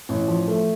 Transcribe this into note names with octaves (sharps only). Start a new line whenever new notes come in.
A1
F3
A3